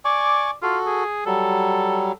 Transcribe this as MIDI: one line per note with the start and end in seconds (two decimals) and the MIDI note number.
0.05 0.54 74
0.05 0.51 80
0.05 0.51 85
0.05 0.51 86
0.63 0.77 65
0.63 1.04 66
0.63 1.04 69
0.86 1.25 68
1.26 2.12 54
1.26 2.12 55
1.26 2.17 69